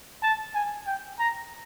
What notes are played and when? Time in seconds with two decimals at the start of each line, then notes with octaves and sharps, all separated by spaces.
0.23 A5
0.55 G#5
0.87 G5
1.19 A#5